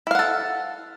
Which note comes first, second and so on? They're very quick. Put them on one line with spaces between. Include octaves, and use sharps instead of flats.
E4 F5 F#5 A4